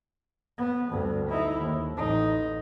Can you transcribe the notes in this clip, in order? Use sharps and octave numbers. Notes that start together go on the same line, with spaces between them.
B3
D2 G2
D#4 E4
D#2
A1 D#4